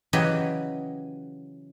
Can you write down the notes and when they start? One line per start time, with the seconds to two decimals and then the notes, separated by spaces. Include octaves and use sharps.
0.13 C#3 E3 F#3 E4 G4 D#5